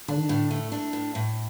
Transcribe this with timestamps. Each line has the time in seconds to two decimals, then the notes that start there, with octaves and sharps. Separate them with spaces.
0.08 D3 D4
0.17 D#3
0.27 A2 D3
0.51 A3
0.72 D4
0.93 A2
1.15 A2